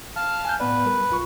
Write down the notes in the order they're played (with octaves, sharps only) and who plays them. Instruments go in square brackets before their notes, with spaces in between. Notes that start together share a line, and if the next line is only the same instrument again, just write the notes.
[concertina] F5 A5 F6
[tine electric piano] G#5 F#6 G6
[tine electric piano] A2 B3 D5 [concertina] B4
[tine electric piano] G3 A#4
B1 F4 C#6